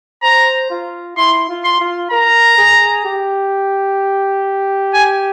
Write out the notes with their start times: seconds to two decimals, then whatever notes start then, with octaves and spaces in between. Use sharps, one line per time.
0.23 C5 A#5
0.70 F4
1.17 E4 C6
1.49 F4
1.64 C6
1.80 F4
2.11 A#4 A#5
2.58 G#4
3.05 G4
4.94 G#5